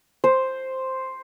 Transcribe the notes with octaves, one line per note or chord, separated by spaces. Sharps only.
C5